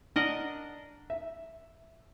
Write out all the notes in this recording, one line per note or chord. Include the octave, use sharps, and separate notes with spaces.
D4 A#4 D#5 F#5
E5